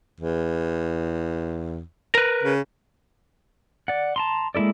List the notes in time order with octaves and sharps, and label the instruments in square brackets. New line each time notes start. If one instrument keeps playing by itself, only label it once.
[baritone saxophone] E2
[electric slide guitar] A#4 B4
[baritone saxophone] C#3
[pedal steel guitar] D5 F#5
A5 A#5 C6
G#3 A#3 E4 A4 D5